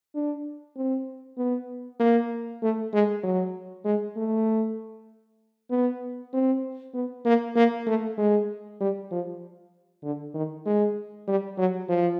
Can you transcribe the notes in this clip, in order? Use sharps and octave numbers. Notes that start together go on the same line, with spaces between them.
D4
C4
B3
A#3
A3
G#3
F#3
G#3
A3
B3
C4
B3
A#3
A#3
A3
G#3
G3
F3
D3
D#3
G#3
G3
F#3
F3